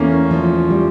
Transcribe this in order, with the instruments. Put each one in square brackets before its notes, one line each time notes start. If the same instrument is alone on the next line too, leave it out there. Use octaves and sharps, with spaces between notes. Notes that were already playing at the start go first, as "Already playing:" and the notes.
Already playing: [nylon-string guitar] E2 [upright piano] A3 A#3 C#4
[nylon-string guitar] F3
G3